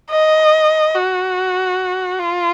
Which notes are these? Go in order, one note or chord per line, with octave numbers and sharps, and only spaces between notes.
D#5
F#4
F4